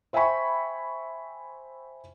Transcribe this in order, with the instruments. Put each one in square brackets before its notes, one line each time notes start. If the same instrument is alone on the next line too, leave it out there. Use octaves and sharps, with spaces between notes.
[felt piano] C5 E5 G5 G#5 B5 C#6